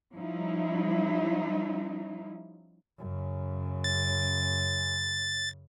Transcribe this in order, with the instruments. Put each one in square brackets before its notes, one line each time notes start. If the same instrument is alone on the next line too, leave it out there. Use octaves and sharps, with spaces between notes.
[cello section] F3 G3 C#4 D#4 E4
[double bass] F#2 C#3
[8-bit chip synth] A6